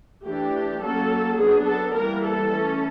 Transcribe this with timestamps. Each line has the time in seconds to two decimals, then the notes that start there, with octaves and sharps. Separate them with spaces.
0.26 E3 A3 D4 G4
0.82 F#3 A#3 C#4 A4
1.38 F#3 B3 D4 G#4
1.67 A4
1.94 E3 G3 A#3 A#4
2.24 A4
2.51 E3 A3 C#4